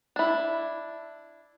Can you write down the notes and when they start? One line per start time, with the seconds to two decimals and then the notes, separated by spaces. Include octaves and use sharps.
0.16 D4 E4